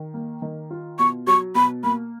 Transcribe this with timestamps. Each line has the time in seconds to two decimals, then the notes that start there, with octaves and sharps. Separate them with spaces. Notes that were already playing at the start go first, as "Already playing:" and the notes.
Already playing: D#3
0.14 A#3
0.42 D#3
0.71 F4
0.99 B2 C#6
1.27 F#3 C#6
1.55 B2 B5
1.83 A#3 B5